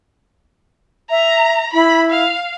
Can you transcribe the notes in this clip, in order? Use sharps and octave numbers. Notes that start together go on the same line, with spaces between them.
E5 A#5
E4 B5
F5